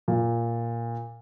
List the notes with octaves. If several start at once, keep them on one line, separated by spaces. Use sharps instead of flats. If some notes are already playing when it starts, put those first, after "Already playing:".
A#2